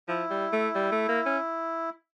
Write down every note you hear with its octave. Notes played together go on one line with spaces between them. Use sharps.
F3 E4
G3
A3
G3
A3
A#3
C#4